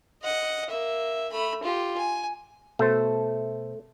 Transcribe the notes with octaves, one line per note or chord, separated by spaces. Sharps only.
D#5 F#5
A#3 E5
A3 B5
F4 G4
G#5
B2 A3 A4 C5